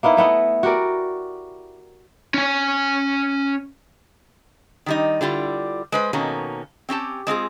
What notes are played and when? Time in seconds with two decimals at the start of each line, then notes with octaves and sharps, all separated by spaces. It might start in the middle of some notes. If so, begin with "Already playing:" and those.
0.03 A#3 B3 D#4 E4
0.17 A3 B3 E4 D#5
0.63 F#4 G4 A#4 D5
2.34 C#4 G#5
4.86 D#3 G3 D#4
5.21 D3 G3 E4 F4
5.92 G#3 B4 C5
6.13 B2 D#3 A#3 C#4 A4
6.89 C4 C#4 G4 A5
7.27 G#3 C4 F4 G#4